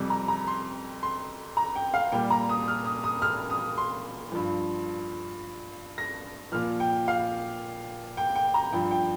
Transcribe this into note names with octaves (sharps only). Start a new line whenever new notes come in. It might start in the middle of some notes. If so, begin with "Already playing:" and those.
Already playing: F2 C3 G3
A#5
A#5
C6
C6
A#5
G5
F5
A#2 G3 G5
A#5
D#6
F6
D#6
D#6
F6
D#6
C6
G2 F3
A#6
A#2 F3 F6
G5
F5
G5
G5
A#5
G2 F3 G5
G5